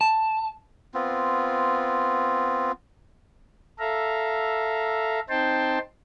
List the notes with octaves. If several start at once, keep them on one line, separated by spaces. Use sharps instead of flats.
A5
B3 C4 F4
A4 E5 F5 A#5
C4 D#4 C5 G5 A5 C6